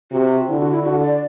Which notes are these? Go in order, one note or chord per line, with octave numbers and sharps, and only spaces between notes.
C3 F#4
D3 E4
F#4
E4
D3 F#4
D5